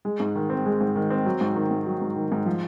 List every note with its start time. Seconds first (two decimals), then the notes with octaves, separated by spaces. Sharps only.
0.05 G#3
0.20 G#2
0.35 D#3
0.50 C4
0.65 G#3
0.81 G#2
0.96 D#3
1.10 C4
1.26 F#3
1.41 G#2
1.56 D#3
1.71 G#2
1.86 F#3
2.01 G#2
2.16 D#3
2.32 G#2
2.46 F3